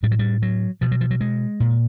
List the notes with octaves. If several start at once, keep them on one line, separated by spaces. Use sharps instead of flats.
A2 G3
F#3
G3
F#3
B2 F3
F#3
F3
F#3
G#3
A#2